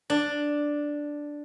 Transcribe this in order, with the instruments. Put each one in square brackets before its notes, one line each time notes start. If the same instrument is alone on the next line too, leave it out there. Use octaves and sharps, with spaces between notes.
[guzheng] D4